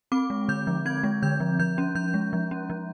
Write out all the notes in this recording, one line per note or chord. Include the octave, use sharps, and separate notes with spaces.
C4 D6
G#3
D3 G6
F3
C4 G#6
G#3
D3 G6
F3
F3 G6
C#4
F3 G6
G#3
F3
C#4
F3